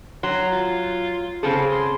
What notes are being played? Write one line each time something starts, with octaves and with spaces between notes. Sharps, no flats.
F#3 C6
F4
C#3 C4 G#4 A4
C6